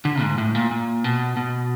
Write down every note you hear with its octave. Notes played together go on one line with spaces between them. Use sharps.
D3
G#2
A2
A#2
A#2
B2
B2